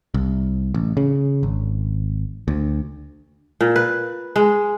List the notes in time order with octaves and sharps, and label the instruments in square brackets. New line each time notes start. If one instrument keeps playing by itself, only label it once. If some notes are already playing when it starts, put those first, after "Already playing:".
[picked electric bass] C2
A1
C#3
G#1
D2
[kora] A#2
B4
G#3